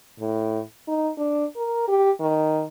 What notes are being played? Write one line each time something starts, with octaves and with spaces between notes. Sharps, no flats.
A2
D#4
D4
A#4
G4
D#3